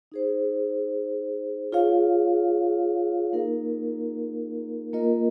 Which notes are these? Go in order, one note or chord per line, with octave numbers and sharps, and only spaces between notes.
D#4 G#4 C5
F4 G#4 C#5 F5
A#3 D#4 A#4
A#3 F4 A#4 D#5